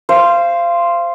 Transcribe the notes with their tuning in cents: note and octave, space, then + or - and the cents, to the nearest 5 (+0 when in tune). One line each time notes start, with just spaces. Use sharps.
C5 +0 F5 -25